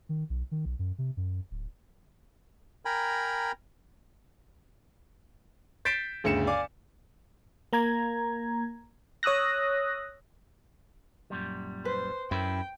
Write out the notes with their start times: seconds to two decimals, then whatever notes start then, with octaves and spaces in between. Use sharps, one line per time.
0.09 D#3
0.30 B1
0.51 D#3
0.65 B1
0.79 F#2
0.98 C3
1.17 F#2
1.51 D1
2.85 A#4 G5 G#5 A#5 B5
5.85 G6 A6 B6 C7 D7 E7
6.24 G1 D2 C#3 C#7 E7
6.47 D5 F5 G#5 D6
7.73 A#3 A#5 G#6
9.23 C#5 D#6 E6 F#6 A#6
11.30 F#2 A#2 G3
11.85 B4 C5
12.31 F#2 E4 G5